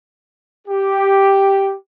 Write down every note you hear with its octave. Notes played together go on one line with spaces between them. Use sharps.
G4